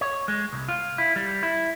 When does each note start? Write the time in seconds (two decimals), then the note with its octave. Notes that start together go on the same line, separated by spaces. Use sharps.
0.01 C#5
0.28 G#3
0.52 C2
0.68 F4
0.98 E4
1.16 G3
1.43 E4